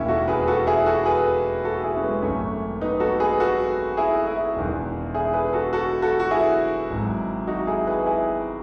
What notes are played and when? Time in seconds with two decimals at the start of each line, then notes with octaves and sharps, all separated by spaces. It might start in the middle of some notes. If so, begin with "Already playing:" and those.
Already playing: E1 D#2 D#3 C#4 E4
0.08 F#4 A4
0.28 G#4 B4
0.47 F#4 A4
0.67 E4 G#4
0.86 F#4 A4
1.06 G#4 B4
1.64 F#4 A4
1.84 E4 G#4
1.97 C#4
2.03 G#3 B3
2.22 G#1 F#2 C#3 A3 C#4
2.81 B3 D#4
3.00 F#4 A4
3.20 G#4 B4
3.40 F#4 A4
3.97 E4 G#4
4.27 E4 G#4
4.56 E1 E2 D#3
5.14 E4 G#4
5.34 G#4 B4
5.53 F#4 A4
5.73 F#4 A4
6.02 F#4 A4
6.20 F#4
6.31 E4 G#4
6.90 G#1 G#2 F#3
7.47 D#4 F#4
7.67 E4 G#4
7.87 G#4 B4
8.06 E4 G#4